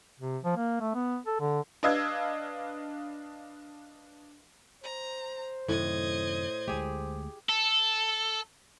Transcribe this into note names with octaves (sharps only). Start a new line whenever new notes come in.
C3
F3
A#3
A3
B3
A4
D3
D4 B4 D#5 F5 E6 G#6
C5 A#5
F#2 A2 C3 D#3 D#5 G#6
D2 G#3 A3 G4 G#4
A4